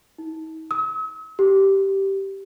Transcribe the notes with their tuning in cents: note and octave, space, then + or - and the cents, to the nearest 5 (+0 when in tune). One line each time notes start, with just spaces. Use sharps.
D#4 +45
E6 -45
G4 -10